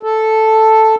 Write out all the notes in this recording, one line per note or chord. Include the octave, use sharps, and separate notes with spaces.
A4